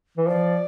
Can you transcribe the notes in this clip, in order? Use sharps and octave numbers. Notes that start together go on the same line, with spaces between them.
E3
F3 D5